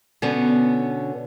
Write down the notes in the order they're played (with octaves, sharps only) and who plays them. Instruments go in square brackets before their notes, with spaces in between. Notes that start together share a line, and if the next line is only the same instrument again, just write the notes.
[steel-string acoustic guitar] B2 D3 B3 C#4